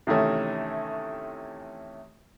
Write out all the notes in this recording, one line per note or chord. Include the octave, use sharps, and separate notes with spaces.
C3 D#3 E3 A3 C#4